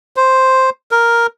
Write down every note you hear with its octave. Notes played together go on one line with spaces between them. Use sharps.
C5
A#4